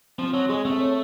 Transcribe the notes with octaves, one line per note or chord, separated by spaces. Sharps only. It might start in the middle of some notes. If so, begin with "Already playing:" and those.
F3 C4
F#3 C#5
G#3 G#4
A3 C4
C#5